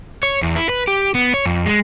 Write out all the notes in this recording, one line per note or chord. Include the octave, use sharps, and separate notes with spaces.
C#5
E2
E4
B4
G4
B3
C#5
F2
G#3